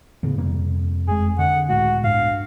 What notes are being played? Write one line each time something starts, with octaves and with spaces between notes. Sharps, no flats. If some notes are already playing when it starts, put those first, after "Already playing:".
D#2 A2 C#3 B3
F2 C3 G3 A#3
F#1 G#3 G#4
D3 F#5
C#2 A2 G#3 F#4
G2 F5